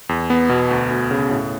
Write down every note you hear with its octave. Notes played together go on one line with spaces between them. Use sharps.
E2
B3
B2
D2
D2
C#3
A2